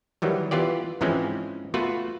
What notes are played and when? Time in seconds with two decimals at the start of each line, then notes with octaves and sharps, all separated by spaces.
0.22 D#3 E3 F#3 G3
0.51 E3 B3 F4 G4 D5
1.01 G#2 E3 F3 G#3 C4 C#4
1.74 A3 B3 F4 F#4 B4